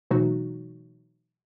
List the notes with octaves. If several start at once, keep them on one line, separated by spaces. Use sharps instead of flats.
B2 E3 F#3 A3 D#4 F#4